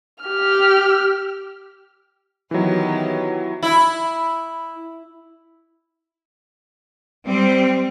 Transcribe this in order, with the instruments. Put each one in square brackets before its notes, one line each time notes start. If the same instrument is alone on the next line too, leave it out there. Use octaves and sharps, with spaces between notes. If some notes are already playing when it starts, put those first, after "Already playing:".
[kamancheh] G4 F6
[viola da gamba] D#3 B3 G4 [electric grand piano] E3 F#3
[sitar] E4
[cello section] G3 C4